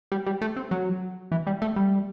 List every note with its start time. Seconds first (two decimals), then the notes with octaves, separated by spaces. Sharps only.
0.12 G3
0.27 G3
0.41 A3
0.56 C4
0.71 F#3
1.32 E3
1.47 G3
1.62 A3
1.76 G3